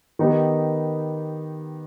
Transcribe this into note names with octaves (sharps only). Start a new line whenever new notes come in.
D#3 B3 D#4 G4 B4